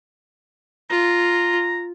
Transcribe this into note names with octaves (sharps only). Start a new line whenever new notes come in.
F4 A#5